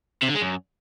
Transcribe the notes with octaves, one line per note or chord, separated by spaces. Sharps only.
C3
D3
G#3
F#2